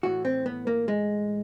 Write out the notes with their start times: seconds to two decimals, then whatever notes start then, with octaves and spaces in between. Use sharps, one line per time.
0.03 A2 E3 F#4
0.25 C4
0.46 B3
0.67 A#3
0.88 G#3